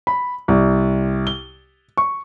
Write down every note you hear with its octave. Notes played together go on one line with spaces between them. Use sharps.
B5
C2
G7
C#6